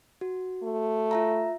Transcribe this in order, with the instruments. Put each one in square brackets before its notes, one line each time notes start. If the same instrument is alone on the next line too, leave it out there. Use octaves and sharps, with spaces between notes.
[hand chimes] F#4
[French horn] A3
[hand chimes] F4 E5 A#5